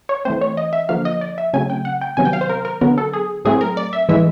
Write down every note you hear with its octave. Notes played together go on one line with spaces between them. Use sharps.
C#5
E3 A3 C4 C5
C#5
D#5
E5
D3 F3 A#3 F5
D#5
D5
E5
C#3 F#3 A3 C4 G#5
G5
F#5
G5
C3 D#3 F#3 B3 G#5
G5
F5
C5
A#4
A#4
D3 F#3 B3 A#4
A4
G#4
A2 F#3 A3 C4 G#4
A#4
D5
E5
A2 E3 G#3 E5